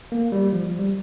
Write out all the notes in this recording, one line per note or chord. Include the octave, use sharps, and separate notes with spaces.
A#3
G3
F3
G3